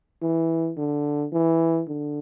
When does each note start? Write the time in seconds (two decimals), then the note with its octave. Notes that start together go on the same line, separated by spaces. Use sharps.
0.22 E3
0.77 D3
1.32 E3
1.88 D3